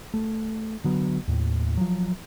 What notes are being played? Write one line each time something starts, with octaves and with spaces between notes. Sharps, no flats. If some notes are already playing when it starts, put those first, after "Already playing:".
A3
D3 F#3 B3
D#2 A2
F3 F#3